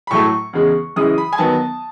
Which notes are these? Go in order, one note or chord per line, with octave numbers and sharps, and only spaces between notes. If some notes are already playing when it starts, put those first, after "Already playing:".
B5
A2 F#3 A3 C#6
E2 C#3 G#3
F#2 C#3 E3 G#3 D#6
B5
G#5
D#3 F#3 B3 A5